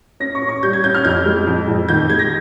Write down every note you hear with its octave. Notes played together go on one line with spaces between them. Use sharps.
C#4 A#6
C#6
C#4
C#6
G3 G6
G#6
C#4 G6
F6
F2 G6
G#3
F2
F2
D#3 G6
G#3 G#6
A#6